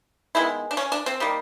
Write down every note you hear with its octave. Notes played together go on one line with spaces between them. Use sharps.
D#3 G#3 B3 E4
D4
C#4
D4
C4
D#3 G3 A#3